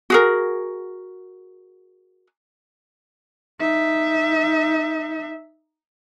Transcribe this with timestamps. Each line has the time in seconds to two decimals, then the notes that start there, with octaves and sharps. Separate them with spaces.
0.10 F#4 G#4 A#4
3.60 D#4 E5